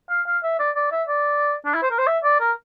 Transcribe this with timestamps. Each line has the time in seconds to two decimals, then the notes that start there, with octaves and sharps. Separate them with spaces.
0.10 F5
0.27 F5
0.43 E5
0.59 D5
0.76 D5
0.91 E5
1.08 D5
1.66 D4
1.74 E4
1.83 C5
1.91 A#4
1.99 C5
2.07 E5
2.24 D5
2.40 A#4